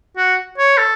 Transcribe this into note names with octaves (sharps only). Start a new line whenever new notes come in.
F#4
C#5
A4